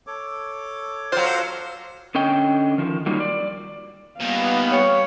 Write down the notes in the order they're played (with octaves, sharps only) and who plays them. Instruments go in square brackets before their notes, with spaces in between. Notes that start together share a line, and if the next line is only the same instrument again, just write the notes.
[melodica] A4 C#5 D6
[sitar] F#3 F4 [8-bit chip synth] C5
[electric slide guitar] D3 C#4 D#5 G5
D#3 F3
F#3 G3 A#3 D#4 F4
D5
[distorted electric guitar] A#2 D#3 [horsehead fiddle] G3 F5 [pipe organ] B3
[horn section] G4 C#5